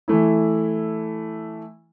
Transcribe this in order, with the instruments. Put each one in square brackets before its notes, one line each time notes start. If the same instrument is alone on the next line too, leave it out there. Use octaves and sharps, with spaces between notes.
[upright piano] E3 A3 E4